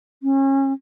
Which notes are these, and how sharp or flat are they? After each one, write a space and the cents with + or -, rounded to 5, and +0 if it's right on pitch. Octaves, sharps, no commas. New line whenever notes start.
C#4 -30